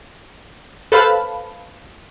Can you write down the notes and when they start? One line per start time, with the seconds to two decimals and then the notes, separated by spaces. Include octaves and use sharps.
0.92 A4 B4 C5 F5 A5 B5